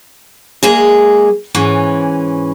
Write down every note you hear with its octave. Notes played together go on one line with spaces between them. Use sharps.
G#3 A#3 G#4
G#2 E3 C#4